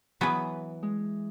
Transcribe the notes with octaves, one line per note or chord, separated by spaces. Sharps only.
E3 F#3 B3 G#4 B4
G#3